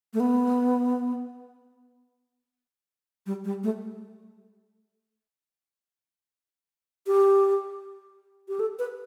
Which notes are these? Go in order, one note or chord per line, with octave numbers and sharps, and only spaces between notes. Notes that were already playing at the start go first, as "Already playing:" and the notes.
A3
B3
G3
G3
A3
G4
G4
A4
B4